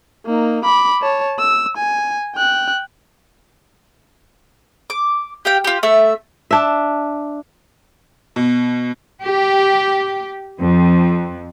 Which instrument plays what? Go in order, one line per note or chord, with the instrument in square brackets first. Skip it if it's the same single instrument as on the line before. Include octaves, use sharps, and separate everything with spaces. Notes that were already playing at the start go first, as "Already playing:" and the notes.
[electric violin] A#3 D#4
B5 D6
C#5 A5
E6
G#5
G5 F#6
[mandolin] D6
G4 F5 G5
F4 G4
A3 E5
[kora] D4 E5
[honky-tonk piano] B2
[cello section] G4
F2